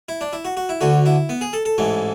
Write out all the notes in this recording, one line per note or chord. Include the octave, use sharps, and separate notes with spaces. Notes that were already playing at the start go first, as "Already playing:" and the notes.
E4
D4
E4
F#4
F#4
E4
D2 D3 F#4
E4
B3
G#4
A4
A4
A1 G#2 E3